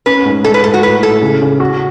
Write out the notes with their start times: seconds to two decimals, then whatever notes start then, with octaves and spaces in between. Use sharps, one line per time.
0.06 C#4 B4
0.25 G#2
0.44 G#2 A4
0.54 B4
0.64 G#2 A4
0.74 F#4
0.83 A2 B4
1.02 A2 A4
1.22 C#3
1.42 C#3
1.60 F#4